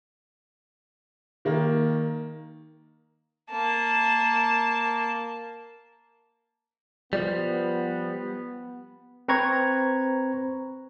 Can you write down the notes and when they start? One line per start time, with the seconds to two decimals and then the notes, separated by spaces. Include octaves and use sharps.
1.45 D#3 A#3
3.51 A#3 A5
7.13 F3 G3 B3
9.28 C4 B4 C5 A#5 C#6 G#6